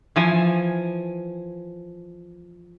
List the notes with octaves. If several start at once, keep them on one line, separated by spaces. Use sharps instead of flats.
E3 F3 G#5